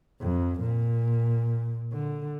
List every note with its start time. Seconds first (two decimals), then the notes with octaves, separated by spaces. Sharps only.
0.21 F2
0.60 A#2
1.93 D3